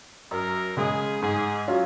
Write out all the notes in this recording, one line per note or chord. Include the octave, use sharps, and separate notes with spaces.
F#2 A#4
C#3 G#3 G#4
G#2 G#4
F#3 C#4 F4